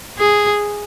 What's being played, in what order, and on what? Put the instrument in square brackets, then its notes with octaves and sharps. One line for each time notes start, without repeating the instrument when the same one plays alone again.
[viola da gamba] G#4